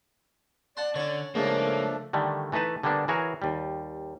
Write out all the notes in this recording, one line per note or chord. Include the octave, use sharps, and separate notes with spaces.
D5 F#5 A5 C6
D3 C#4 C#5
G#2 C#3 F3 A3 A#3 D4 D#4
A4
D3 D#3 G3 A3
E3 A3 D#4 B4 A5
D3 G3 A#3 B3 D4
E3 F#4 G#4 A#4 C#5
D#2 G3